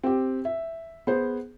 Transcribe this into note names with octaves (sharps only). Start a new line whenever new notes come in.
C4 G4
E5
B3 G#4 C5